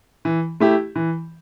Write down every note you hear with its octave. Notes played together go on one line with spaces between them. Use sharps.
E3
A3 E4 G4
E3